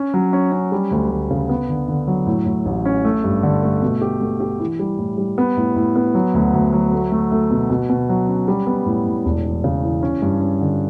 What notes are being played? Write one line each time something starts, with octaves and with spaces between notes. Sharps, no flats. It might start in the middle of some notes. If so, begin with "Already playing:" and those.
Already playing: C#4
F#3
C#4
C#4
G3
D2
D2
C#3
B3
D3
D3
F#3
A2
A2
A1
C#4
A3
G2
D3
A3
B2
G4
A3
G4
E3
G3
A2
G3
B3
A2
A2
B3
F#3
D2
D2
F#3
A3
A3
A3
B2
B2
B2
F#3
C#4
G3
B3
A2
A2
E1
E3
C#3
E3
C#4
G2
C#4
D3